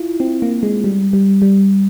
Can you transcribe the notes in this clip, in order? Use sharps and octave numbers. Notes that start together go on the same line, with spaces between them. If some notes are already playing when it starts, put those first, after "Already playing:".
Already playing: E4 F4
C4
A#3
G#3
G3
G3
G3